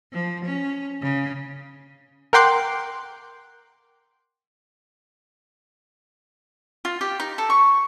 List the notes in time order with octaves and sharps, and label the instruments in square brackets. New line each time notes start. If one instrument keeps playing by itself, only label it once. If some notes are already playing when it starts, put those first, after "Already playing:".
[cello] F3
C#4
C#3
[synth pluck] A#4 F#5 G5 C6 D6 F#6
[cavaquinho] F4
G4
D#4
A4
C#6